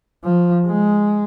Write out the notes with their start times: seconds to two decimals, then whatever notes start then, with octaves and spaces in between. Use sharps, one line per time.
0.24 F3
0.66 G#3